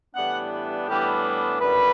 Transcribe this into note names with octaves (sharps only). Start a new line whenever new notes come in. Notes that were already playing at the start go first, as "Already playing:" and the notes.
A2 E3 G3 B3 D4 F#5
A2 E3 G3 B3 D4 G4
F#2 D3 G3 B4